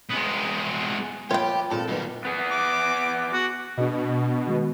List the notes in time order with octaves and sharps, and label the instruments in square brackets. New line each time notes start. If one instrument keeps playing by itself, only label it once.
[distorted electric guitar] G#3 B3
[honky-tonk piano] A#1 [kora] F4 B4 [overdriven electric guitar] G4 [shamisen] C#5 G5
[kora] A#2 [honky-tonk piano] G#3 C4 G#4 [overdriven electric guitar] A4
[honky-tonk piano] B1 B3 [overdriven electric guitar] G2 D#3
[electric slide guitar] B3 G#4
[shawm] D6
F#4
[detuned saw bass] B2 [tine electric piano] D4 G#4 D#5
[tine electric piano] D#3 G#3 F#4